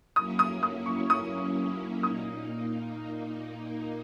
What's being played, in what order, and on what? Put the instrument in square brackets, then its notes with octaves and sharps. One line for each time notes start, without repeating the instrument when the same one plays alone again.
[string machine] F#3 A#3 C#4 E4 [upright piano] D#6
[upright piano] D#6
D#6
C#6
D#6
[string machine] A#2 A#3 D#4 [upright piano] D#6